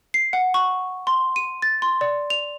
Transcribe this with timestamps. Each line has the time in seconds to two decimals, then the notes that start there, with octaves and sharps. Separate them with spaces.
0.14 C7
0.33 F#5
0.54 C#6
1.07 C6
1.36 D#7
1.62 A6
1.82 C6
2.01 D5
2.30 F7